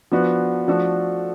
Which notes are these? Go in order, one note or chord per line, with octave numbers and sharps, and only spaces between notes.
F3 B3 D4 F#4
F3 A3 D4 F#4 A4